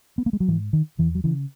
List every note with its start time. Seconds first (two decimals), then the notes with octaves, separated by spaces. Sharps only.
0.18 B3
0.26 A#3
0.33 G#3
0.40 F#3
0.48 G#2 E3
0.73 D#3
0.98 E2 E3
1.15 F#3
1.24 C#3 E3